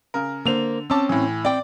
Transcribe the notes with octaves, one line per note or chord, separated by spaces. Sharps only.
C#3 A#4
D3 A#3 C5 F7
C4 C#4 A5 D6 E6
A2 E3
C4 D5 G5